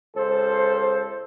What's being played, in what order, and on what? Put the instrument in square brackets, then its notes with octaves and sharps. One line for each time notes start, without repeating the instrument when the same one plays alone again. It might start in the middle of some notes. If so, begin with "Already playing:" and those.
[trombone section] C#2 A4 C5